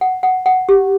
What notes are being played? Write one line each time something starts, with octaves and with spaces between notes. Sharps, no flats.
F#5
F#5
F#5
G4